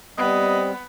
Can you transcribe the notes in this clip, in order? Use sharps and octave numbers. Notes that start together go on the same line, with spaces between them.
G3 B3 C4 D#5